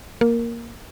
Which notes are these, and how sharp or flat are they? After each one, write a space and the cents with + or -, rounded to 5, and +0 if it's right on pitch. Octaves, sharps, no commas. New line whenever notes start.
A#3 +0 A#4 +0